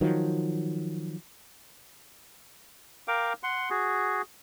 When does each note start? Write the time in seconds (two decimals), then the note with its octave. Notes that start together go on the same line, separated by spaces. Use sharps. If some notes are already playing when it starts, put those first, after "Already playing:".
0.01 D#3 F3 F#3
3.08 A#4 F5 G5 D6
3.43 F#5 C6
3.70 F#4 G#4